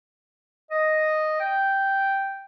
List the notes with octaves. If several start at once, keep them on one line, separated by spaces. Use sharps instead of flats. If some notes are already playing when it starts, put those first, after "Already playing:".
D#5
G5